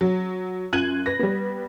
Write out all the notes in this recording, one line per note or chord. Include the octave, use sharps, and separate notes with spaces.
F#3
F#2 F4 F#6 G#6 D#7 F#7
B4 A#6
G3 B3